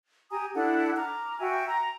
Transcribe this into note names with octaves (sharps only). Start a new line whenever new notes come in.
G4 G#5 A#5 D#6
D4 E4 A4 F#5
A#5 D6 F6
F#4 E5 G5 G#5
A#5